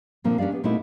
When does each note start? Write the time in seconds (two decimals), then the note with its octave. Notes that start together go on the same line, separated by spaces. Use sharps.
0.24 A#2 D3 F3 A#3 C4
0.38 C#4 D4 G4 D5 F5
0.52 B3 G4
0.64 A#2 A3 C4 D#4 E4 F#4